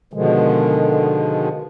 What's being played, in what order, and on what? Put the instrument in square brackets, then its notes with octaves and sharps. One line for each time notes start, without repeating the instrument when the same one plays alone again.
[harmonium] B2 D3 D#3 F3 G#3